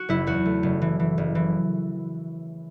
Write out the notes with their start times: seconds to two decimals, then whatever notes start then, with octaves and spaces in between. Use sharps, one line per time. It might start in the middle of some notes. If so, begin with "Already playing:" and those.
Already playing: F#4
0.09 F#1 E4
0.27 E2 F#4
0.45 A3
0.63 F#1
0.82 E3
1.00 E3
1.18 F#1
1.35 E3